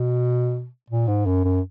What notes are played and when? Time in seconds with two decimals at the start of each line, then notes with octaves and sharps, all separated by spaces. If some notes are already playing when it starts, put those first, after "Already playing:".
Already playing: B2
0.90 A#2
1.07 G#2
1.26 F#2
1.44 F#2